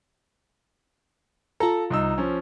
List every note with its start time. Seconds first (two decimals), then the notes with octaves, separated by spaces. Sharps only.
1.60 F4 A4 A#5
1.90 C2 D#4 E6
2.18 F3 C#4